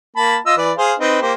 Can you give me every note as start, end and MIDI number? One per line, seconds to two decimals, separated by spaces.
0.16 0.36 58
0.16 0.36 81
0.16 0.36 83
0.46 0.55 65
0.46 0.55 75
0.46 0.55 88
0.58 0.72 52
0.58 0.72 71
0.58 0.72 74
0.78 0.93 68
0.78 0.93 72
0.78 0.93 77
1.00 1.17 60
1.00 1.17 63
1.00 1.17 71
1.21 1.33 58
1.21 1.33 67
1.21 1.33 72